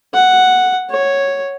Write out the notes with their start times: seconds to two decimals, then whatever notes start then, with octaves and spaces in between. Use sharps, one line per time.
0.14 F#5
0.90 C#5